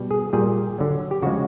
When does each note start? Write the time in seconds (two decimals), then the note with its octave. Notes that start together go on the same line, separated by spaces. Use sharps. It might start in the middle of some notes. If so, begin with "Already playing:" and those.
Already playing: B2 G3
0.11 G#4
0.33 A#2 G3 G#4
0.79 D3 F#3
1.11 G4
1.22 C#3 F3 G#3 F#4